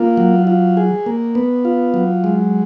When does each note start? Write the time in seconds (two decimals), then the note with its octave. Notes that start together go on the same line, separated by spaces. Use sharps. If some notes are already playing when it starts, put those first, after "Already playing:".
Already playing: A#3 F4
0.17 F#3
0.47 F4
0.77 G#4
1.06 A#3
1.35 B3
1.65 F4
1.94 F#3
2.24 G#3